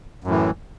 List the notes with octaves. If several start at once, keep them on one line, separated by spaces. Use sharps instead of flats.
F#2 A2 E3